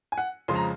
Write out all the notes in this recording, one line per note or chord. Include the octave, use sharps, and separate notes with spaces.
G#5
F#5
F2 C#3 F3 G#3 C6
A#5